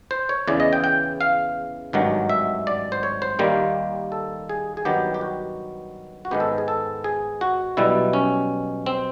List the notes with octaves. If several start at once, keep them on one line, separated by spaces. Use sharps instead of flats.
C5
C#5
E2 C#3 E3 D5
D#5
G5
G5
F5
G#1 G2 D#3 F#3
E5
D5
C5
C#5
C5
D#2 D#3 G3 A#3
A4
G#4
G#4
G2 D#3 F#3 B3 G4
G4
F#4
F#4
G#2 D#3 G#3 B3 G4
A4
G#4
A4
G#4
F#4
B1 B2 G3 E4
C#4
C4